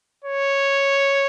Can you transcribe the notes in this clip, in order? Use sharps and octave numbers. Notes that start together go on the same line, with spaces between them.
C#5